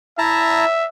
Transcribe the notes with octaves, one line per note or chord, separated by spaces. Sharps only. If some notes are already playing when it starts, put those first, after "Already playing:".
E4 E5 A5 A#5